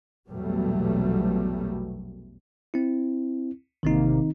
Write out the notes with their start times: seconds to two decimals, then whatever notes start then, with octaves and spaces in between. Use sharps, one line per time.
0.28 A#1 E2 B2 F#3 G3 A3
2.74 C4 E4
3.83 A1 C3 D#3 A#3 C4 D#4